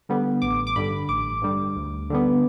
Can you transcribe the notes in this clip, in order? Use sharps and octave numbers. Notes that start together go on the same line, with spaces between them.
D3 G3 B3
A1 D6
D6
G2 D3 G3 B5
A1 D6
G2 D3 G3
D2
D3 G3 B3